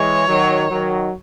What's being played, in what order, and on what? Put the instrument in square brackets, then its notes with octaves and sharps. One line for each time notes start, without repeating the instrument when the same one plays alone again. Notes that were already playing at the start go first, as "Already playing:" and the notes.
Already playing: [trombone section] E3 G#3 [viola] C#5
[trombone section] D#3 F#3
D#3 F#3